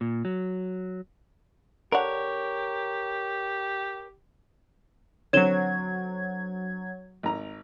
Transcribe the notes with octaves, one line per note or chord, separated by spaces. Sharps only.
A#2
F#3
D3 D4 G4 A#4 C#5 F#5
D3 F#3 C4 C#5 G#6 E7 G7
G#1 A#5